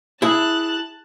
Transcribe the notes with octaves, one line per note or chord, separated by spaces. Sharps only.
E4 G#4 A5 F#6